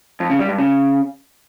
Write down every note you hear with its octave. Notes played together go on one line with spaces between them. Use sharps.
F2
C#3
G3
G2
C#3